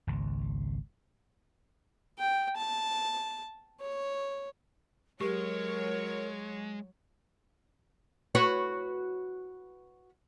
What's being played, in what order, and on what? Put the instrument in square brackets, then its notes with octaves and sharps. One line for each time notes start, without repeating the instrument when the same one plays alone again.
[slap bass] G#1 C#2
[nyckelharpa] G5
A5
C#5
[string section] F#3 C#5 [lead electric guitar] G#3 [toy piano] G4 [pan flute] A#4
[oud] F#4 B4 C#5